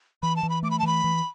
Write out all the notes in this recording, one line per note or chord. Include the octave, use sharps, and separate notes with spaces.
E3 B5
A5
E3
B5
A3 D6
B5
A5
E3 B5
E3